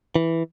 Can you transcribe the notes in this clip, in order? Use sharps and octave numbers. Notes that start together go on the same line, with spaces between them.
E3